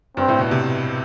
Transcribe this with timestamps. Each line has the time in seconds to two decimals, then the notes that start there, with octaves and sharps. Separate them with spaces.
0.17 G2 C4
0.28 A2
0.39 B2
0.51 C3